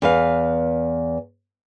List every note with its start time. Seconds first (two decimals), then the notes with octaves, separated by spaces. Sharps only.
0.02 E2 B4 F5